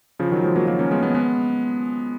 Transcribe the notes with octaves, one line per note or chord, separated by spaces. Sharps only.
C#3 F3
D#3 F#3
F3 G#3
F#3 A#3
F#3 A#3
A#3 C#4
G#3 B3
G#3 B3
G#3 B3